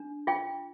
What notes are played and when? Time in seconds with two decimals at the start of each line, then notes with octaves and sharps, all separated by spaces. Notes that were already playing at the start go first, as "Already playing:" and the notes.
Already playing: D4
0.27 F4 G5